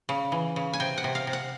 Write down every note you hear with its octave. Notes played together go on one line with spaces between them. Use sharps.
C#3
E3
C#3
G#5
C3 G5
F#5
C3
F5
C3
F#5